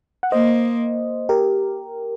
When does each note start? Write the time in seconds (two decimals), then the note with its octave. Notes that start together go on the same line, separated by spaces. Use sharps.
0.23 F#5
0.32 A#3 C5 D#5
1.29 G4 A#4